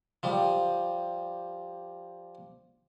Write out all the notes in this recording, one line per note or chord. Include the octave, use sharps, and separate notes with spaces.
F3 G3